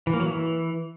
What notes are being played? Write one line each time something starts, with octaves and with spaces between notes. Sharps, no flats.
E3
A#3
F#3
E3